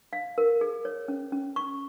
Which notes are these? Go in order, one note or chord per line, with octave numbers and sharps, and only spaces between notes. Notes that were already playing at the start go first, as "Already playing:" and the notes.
F5
A#4
G#4
C#5
C#4
C#4
C#6